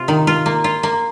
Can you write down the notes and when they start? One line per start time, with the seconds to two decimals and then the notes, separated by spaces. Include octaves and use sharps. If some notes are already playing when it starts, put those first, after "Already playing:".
Already playing: C3 F4
0.08 D#3
0.27 F4
0.46 A#3
0.64 F4
0.83 A#3